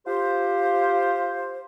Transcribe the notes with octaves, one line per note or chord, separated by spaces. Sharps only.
F4 G4 C5